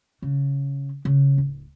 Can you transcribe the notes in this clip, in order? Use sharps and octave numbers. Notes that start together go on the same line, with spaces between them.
C#3
C#3
D1